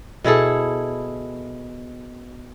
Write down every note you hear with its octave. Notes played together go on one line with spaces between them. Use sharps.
B2 E4 G#4 A4